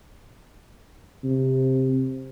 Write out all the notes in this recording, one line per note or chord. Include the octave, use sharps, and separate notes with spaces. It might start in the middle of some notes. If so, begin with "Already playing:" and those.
C3